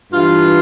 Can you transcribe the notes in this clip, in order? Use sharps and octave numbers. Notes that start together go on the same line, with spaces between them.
G2 E3 F4